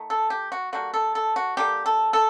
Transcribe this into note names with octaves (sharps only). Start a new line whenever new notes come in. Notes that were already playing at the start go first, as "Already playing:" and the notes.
Already playing: D#3 A3
A4
G4
F#4
D3 G3 A#3 F#4
A4
A4
F#4
D3 G3 A#3 G4
A4
A4